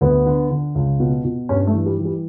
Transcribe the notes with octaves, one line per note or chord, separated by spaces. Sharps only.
D2 B3
D3
D3
C#2
B2
B2
G2 C#4
A3
E3
G3
E3
G3